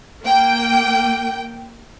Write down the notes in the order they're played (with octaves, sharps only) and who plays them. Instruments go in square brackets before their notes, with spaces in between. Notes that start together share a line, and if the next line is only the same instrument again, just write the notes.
[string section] A#3 G5